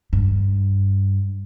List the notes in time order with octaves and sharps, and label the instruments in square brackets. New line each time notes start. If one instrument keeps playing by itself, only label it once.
[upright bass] G2